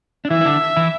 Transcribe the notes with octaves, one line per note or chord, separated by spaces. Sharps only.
D4
E3 E4 E5
E4
D3 D4
E3 E4